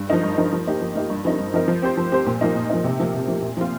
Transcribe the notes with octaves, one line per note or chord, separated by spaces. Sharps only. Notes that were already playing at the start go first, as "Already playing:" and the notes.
Already playing: G2
F3 D#4 A#4
G2
F3 D#4 A#4
F3
A#3 D#4 G4
F3
A#3 D#4 G4
G2
F3 C4 D#4 A#4
G2
F3 C4 D#4 A#4
F3
C4 G4 C5
F3
C4 G4 C5
A#2
F3 A#3 D#4
A#2
F3 A#3 D#4
C3
F3 A#3
C3
F3 A#3
A#2
F3 C4 F4